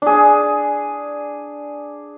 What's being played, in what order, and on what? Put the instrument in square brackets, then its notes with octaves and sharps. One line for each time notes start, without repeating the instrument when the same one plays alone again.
[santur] D4 G#4